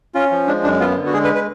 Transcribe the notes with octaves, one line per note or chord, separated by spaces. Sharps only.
C#4 F4
F3
G#3 D4
F#2 D4
B3 F4
D3
F#4
G#3 G#4
B4
B4